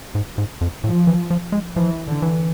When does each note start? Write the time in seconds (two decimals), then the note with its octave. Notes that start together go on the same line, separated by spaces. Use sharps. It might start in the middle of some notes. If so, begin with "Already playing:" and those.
0.15 G#2
0.38 G#2
0.61 F2
0.84 A2 F3
1.07 E3
1.30 F3
1.52 G#3
1.75 E3 F3
2.06 D3
2.22 E3